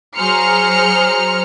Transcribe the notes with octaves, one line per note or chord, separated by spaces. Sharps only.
F#3 G#4 C5 A#5 F6 C#7